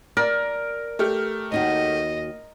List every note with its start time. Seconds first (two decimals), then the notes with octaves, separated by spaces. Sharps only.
0.17 A#4 D5
0.99 A3 G4 F6
1.52 D#2 D#4 F#4 D#5